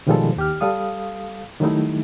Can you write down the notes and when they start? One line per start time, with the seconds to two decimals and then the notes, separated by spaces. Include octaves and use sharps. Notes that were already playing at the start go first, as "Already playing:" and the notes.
0.07 B2 D#3 F3 G3 G#3 A4
0.36 D#2 G4 F6
0.61 G3 A4 F5 D#6
1.60 D#3 F#3 G3 A3 D#4 E4